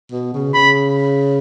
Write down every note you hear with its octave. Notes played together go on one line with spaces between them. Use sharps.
B2
C#3
C#3 B5